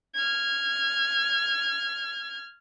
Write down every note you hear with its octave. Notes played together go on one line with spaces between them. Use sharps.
F6 G#6